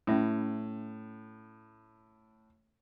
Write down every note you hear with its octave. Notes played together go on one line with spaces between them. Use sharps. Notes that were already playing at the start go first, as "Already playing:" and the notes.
A2 C#4 E5 B5